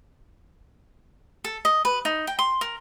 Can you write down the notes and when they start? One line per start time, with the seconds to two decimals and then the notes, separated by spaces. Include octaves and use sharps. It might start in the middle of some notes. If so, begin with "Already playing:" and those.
1.44 A4
1.65 D#5
1.85 B4
2.05 D#4
2.27 G5
2.39 C6
2.61 A#4